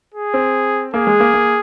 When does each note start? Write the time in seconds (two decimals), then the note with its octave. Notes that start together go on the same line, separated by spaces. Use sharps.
0.14 G#4
0.34 C4
0.94 A#3 G#4
1.07 G#3
1.20 A#3
1.34 A#3